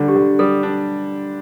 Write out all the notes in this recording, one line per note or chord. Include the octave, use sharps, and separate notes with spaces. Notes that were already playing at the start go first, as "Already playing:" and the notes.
Already playing: D3 G3 D4
G4
D3
G3 A4
D4